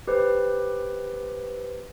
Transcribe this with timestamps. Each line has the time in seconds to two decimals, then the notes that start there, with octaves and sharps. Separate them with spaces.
0.07 G4 B4 C5